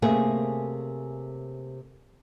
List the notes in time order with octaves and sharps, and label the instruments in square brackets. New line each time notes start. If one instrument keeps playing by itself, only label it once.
[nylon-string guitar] C3 A3 A#3 C#4 G#4